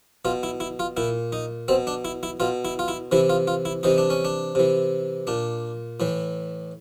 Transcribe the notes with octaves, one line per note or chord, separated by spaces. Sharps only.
B2 F4
E4
E4
F4
A#2 E4
D#4
B2 C4
D4
E4
E4
B2 F4
E4
F4
E4
C3 E3 E4
F4
F4
E4
C3 E3 D#4
D4
C#4
D4
C3 E3
A#2 D4
A2 E3